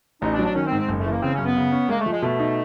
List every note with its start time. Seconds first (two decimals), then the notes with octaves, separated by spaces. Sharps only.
0.22 A1 D#4
0.33 D4
0.39 F#3
0.45 D4
0.55 D#3 C#4
0.67 C4
0.72 G#2
0.78 C4
0.89 F#1
1.00 A3
1.06 E3
1.11 A#3
1.22 C#3 C4
1.34 F#2 C#4
1.45 B3
1.56 C#3
1.72 C#4
1.89 G#3 A#3
2.00 A3
2.06 F3
2.12 G#3
2.22 B2 A3
2.39 D#4